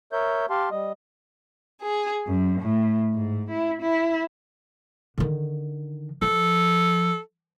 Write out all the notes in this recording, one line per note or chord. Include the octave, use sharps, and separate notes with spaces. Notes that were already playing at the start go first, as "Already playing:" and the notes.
A#4 C#5 E5 G6
G4 F5 A5 C6
G3 D#5
G#4
F#2
A2
G#2
E4
E4
D3 D#3
F3 A4